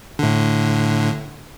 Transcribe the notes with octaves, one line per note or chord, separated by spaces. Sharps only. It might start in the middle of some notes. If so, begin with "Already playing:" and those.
A2 D3